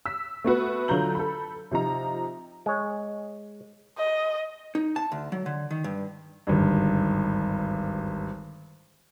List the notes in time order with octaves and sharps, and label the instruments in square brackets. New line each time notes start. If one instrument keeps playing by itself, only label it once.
[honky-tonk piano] E6 B6
A3 B3 F#4 B4
D3 F#3 F4 A#5 G6 F#7
A4 B5
C3 F3 D#4 A#5
[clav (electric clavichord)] G#3 C#5
[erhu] D#5
[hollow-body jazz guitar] D#4
A5
D2
F#3
D3
D#3
G2
[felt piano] G#1 D2 G2